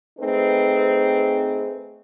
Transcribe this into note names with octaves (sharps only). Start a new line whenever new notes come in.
A3 C4 D#4 G#4 B4